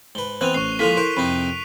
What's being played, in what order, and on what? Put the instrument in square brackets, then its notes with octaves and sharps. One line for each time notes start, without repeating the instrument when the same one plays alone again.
[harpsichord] G#2 B4 [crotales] G7
[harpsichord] E3 B3 C4 [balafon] C5 [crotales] F#6 D#7 F7
[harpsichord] A1 [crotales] C#6 F#6 C7
[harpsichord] F3 G#3 A#3 [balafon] E4 A4 [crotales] B6 D#7 F7
[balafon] E4 A#4 [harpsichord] C5 [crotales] D7
[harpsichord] F2 C3 D#4 [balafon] B5